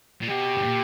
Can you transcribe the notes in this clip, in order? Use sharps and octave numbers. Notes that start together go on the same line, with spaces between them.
A#2
B2 G4
G2
A#2